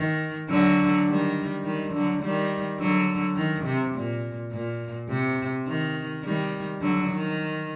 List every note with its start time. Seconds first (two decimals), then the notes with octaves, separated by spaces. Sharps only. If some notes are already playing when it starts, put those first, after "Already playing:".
Already playing: D#3
0.50 D3 F#3
1.07 D#3 G3
1.64 D#3 G3
1.93 D3 F#3
2.22 D#3 G3
2.79 D3 F#3
3.36 D#3
3.65 C3
3.95 A#2
4.51 A#2
5.09 C3
5.67 D#3
6.23 D#3 G3
6.81 D3 F#3
7.10 D#3